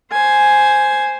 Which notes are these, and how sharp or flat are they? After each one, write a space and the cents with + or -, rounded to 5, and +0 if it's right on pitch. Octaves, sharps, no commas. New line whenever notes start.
C5 +0 G#5 +0